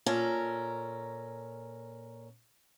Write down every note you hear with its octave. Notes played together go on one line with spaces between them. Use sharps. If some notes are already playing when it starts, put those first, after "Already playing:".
A#2 C#4 A4 A#4